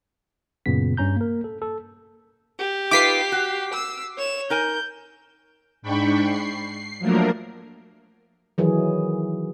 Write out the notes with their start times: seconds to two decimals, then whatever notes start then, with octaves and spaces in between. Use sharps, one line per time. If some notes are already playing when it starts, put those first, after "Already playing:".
0.66 F#2 A#2 C#3 B3 B6
0.97 G2 C#4 A#5 G6
1.16 A#3 A#4
1.44 A4
1.62 A4
2.59 G4
2.91 D#4 F4 B4 D6 B6 C7
3.32 F#4
3.74 E6
4.17 C#5 E7
4.50 D#4 A#4 G#5 G6
5.82 G#2 D4 G5 B5 C#6
6.23 C7
7.00 F3 F#3 A3 A#3 D4 A#4
8.58 D#3 E3 F#3 G#4